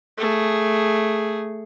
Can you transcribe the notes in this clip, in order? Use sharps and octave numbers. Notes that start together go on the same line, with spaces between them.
A3 G#4